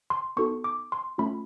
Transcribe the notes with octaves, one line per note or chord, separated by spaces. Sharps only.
C6
B3 D#4 F#4 A4 C#6
D6
C6
A3 C#4 F4 B5